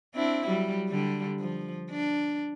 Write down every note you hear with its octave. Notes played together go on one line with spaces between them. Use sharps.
C4 D4 E4
F#3 G3
D3 G3
F3
D4